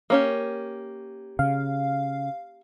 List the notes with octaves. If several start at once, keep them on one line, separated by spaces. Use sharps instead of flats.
A#3 C#4 G4
C#3 F5